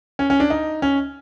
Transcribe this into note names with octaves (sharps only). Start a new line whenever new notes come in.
C#4
C#4
D4
D#4
C#4